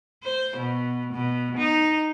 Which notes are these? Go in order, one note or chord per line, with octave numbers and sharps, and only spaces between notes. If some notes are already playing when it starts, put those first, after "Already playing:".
C5
B2
B2
D#4